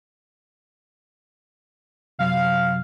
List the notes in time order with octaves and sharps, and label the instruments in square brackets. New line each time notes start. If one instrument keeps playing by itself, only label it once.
[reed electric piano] F#2 C3 F#3 [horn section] F5